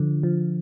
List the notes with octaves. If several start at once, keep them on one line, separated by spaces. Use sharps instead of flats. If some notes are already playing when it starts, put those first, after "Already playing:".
Already playing: D3 F3
F3